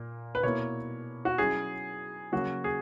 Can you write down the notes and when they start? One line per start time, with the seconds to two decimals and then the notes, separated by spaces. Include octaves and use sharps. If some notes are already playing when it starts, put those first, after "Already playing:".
Already playing: A#2 A#3
0.35 B4
0.43 B2 A#3 E4 C#5
1.25 F#4
1.38 F#3 C#4 E4 G#4
2.32 C#3 F#3 A#3 F#4
2.64 G#4